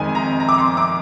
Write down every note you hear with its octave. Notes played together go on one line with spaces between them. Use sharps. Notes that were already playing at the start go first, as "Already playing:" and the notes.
Already playing: F2 D#3 G#3 G#5
A#5
A#5
D6
C6
D6